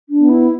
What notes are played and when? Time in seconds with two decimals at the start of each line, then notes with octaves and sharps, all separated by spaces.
0.09 D4
0.19 B3
0.29 E4